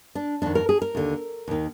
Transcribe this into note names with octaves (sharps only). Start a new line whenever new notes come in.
D4
F2 D#3 D4
A#4
G#4
A#4
D#2 D3
D#2 D#3